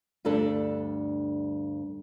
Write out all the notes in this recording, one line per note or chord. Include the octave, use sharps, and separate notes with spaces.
D2 G2 G3 D4 A4 A5